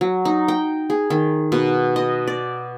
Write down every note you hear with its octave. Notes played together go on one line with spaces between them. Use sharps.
F#3
D#4
G5
G#4
D#3
B2
D#5
D5